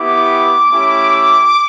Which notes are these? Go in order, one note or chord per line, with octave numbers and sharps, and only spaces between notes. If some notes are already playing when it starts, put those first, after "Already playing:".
Already playing: B3 E4 G4 D6
A3 C#4 E4 G4